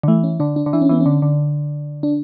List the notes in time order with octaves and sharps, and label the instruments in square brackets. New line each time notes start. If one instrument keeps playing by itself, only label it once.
[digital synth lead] D3
[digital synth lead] E3 [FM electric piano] A3
[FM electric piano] C#4
[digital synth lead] D3 [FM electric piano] D4
[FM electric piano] D4
[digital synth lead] D3
[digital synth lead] E3 [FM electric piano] D4
[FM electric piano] C#4
[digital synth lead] E3 [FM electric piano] B3
[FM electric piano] C#4
[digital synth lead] D3
D3
[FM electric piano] D4